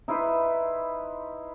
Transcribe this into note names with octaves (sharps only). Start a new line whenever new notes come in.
D#4 E4 B4 C5